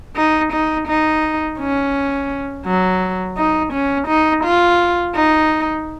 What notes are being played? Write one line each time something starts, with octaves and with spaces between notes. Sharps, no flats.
D#4
D#4
D#4
C#4
F#3
D#4
C#4
D#4
F4
D#4